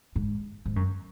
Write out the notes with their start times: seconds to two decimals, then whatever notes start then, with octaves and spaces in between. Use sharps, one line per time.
0.16 G#2
0.66 G#2
0.76 F#2